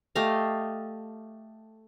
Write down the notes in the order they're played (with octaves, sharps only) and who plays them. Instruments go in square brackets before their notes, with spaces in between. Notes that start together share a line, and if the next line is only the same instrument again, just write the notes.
[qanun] A3 G4 D#5 F5